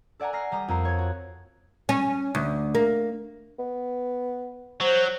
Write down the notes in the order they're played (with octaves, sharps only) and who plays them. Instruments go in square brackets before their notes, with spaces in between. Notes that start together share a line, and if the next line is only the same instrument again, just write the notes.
[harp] A4 D5 F#5 G#5 A#5
A#5 F6 A#6 C7
G3 A#5 D#6
F2 A#4 A#5 C7
C#5 G#6
F#4
[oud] C#4
D2
A#3
[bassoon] B3
[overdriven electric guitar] F#3 [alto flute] C5